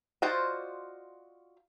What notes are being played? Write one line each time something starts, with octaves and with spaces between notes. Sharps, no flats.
F4 F#4 C5 D5 D#5